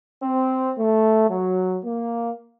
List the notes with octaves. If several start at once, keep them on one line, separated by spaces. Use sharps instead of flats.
C4
A3
F#3
A#3